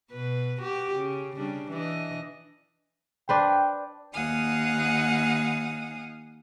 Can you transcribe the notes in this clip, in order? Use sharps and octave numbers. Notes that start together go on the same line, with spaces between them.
B2 B4
F#4 G4
C#3
C#3 G3 D4
E3 D4 D#5
D4 B4 C5 G5
D#2 D#4 F5 F#5 G#5 D#6